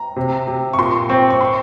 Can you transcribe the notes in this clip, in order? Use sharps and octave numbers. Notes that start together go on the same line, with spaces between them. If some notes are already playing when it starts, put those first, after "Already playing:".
Already playing: A#5
C3
C3
C#6
A#2 C6
C4 C#6
C#6
C6